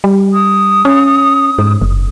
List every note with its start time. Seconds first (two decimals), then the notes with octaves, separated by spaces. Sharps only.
0.04 G3
0.34 D#6
0.85 C#4
1.58 G#2
1.82 F#1